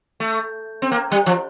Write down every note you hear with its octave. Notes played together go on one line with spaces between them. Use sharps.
A3
C4
A#3
G3
F3